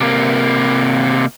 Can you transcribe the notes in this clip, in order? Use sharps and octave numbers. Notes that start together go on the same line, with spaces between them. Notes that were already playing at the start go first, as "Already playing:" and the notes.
C3 A#3